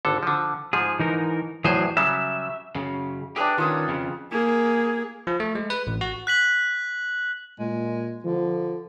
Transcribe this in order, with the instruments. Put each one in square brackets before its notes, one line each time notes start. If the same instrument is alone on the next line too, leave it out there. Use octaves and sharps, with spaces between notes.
[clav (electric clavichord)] G#1 D3 A4
D3 F3
[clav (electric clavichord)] G#2 F3 [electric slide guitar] G#4
[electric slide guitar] E3 D#4 A#4
[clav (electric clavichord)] E2 A2 C5 [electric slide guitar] E3 F#3 G#4
[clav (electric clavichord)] C#3 F#3 G3 [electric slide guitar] E5
[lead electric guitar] F#2 C#3
[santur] D4 B4 E5 [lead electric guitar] G4 G#4
[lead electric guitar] D#3 C#4 [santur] F4 D#6 E6
[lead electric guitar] F2 C#3
[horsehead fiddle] A#3 G#4
[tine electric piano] F3
A3
G#3
B4
A1
F#4
[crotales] F#6 B6 F#7
[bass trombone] A#2 [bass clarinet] G#3
[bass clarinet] D3 [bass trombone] F3